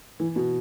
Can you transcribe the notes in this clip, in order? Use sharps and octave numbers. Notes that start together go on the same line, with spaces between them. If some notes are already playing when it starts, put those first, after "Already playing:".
E3
B2